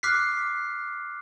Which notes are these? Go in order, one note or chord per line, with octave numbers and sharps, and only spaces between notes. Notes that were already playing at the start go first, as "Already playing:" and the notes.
D6 F6 F#6 B6 C7